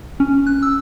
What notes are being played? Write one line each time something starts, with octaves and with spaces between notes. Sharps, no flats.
C#4
F#6
E6